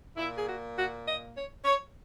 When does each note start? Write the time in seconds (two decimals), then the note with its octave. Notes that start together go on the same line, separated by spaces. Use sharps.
0.17 A#2 A#3 E4
0.36 G#4
0.47 F#4
0.76 F#4
1.06 D#5
1.35 C#5
1.65 C#5